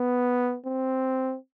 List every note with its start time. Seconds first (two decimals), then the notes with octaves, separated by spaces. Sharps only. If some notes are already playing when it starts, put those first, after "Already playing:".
Already playing: B3
0.66 C4